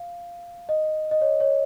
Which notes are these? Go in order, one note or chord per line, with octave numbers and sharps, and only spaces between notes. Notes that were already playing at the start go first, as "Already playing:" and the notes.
Already playing: F5
D#5
D#5
C#5
C#5